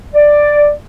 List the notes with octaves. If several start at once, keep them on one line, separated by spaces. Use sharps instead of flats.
D5